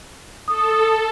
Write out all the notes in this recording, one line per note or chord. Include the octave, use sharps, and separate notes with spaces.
A4 D#6